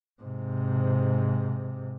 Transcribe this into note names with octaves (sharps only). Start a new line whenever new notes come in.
G#2 C3